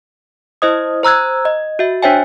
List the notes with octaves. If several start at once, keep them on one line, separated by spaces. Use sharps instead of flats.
E4 C5 D#5 D#6
C5 A#5 E6 F#6 G#6
D#5
F#4 E5
D4 C5 C#5 E5 G5 G#5